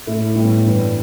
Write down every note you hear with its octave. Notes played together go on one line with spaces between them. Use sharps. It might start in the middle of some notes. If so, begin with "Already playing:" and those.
A2 A3 E4
A2 G3 B3
G2 E3 G3 D4 B4